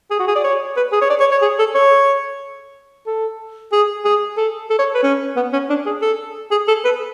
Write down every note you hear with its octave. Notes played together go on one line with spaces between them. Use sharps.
G#4
F#4
G#4
D5
C#5
B4
G#4
C#5
D5
C#5
C#5
G#4
A4
C#5
A4
G#4
G#4
A4
A4
C#5
B4
C#4
B3
C#4
D4
G#4
A4
G#4
A4
B4